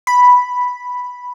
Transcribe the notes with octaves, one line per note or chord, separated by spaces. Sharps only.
B5